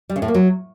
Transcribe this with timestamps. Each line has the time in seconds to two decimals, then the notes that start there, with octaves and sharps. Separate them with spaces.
0.09 G3
0.16 C#3
0.22 A2
0.28 A#3
0.34 F#3